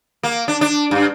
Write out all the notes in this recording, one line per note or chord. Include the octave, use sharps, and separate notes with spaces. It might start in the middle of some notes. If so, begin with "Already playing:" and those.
A#3
D4
D4
G2